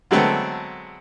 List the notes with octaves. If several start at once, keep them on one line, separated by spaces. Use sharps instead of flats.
D3 F#3 G#3 A3 B3 C4